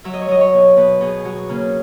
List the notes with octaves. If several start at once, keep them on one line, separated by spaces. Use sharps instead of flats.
F#3 E5
D#5
C#5
F#3 D#5
C#5
B2
B2 B4
B2 G#4
F#3 F#4
C#3 A#3